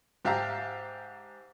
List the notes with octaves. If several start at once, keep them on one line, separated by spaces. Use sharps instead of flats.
G#2 G4 E5 F5 A5 A#5